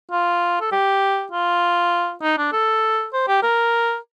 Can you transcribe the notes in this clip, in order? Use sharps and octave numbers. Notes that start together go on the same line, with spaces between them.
F4
A4
G4
F4
D#4
D4
A4
C5
G4
A#4